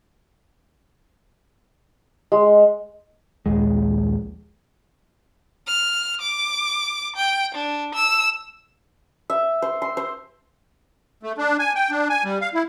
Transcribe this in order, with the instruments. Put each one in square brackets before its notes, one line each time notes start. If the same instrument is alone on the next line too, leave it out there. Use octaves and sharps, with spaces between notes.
[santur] G#3
[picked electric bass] A#1 D#2 G#3
[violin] F6
D6
G5
D4
E6
[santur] E5
C5
C6
C5
[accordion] A3
D4
G#5
G5
D4
G#5
G3
F5
E4